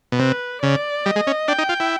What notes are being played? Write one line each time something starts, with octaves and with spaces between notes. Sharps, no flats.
B2
C3 B4
C#3 D5
G3 D#5
G#3
C#4
D4 G5
D#4
F4
E4